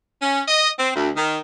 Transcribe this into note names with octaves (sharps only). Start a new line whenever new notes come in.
C#4
D#5
C4
D2
D#3